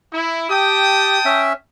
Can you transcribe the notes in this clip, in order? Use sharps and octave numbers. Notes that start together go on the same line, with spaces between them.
E4
G4 G5 A5 D#6
C#4 E5